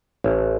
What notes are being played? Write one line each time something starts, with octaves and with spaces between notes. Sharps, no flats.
A1